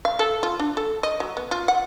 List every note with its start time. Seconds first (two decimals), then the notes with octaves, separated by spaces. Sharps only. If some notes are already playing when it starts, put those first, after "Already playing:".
0.05 F5
0.19 A4
0.43 F4
0.60 D4
0.77 A4
1.03 D#5
1.20 F#3
1.37 B3
1.51 F4
1.68 F#5